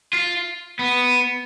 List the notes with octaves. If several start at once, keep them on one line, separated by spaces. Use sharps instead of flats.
F4
B3